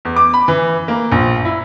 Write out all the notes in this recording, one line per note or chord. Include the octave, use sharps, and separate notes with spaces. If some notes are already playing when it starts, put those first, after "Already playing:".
E2
D6
B5
E3
A#3
A#1
E4